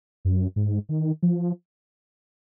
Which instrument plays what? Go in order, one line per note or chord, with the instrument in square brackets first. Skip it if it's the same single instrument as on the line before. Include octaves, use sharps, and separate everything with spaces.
[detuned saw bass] F#2
G#2
D#3
F3